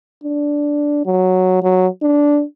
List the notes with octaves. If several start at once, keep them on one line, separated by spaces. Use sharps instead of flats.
D4
F#3
F#3
D4